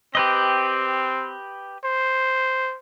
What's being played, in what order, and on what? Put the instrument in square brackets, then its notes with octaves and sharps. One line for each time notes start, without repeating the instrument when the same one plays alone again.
[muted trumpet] C4 [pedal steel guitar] G4 B4 D#5
[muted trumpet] C5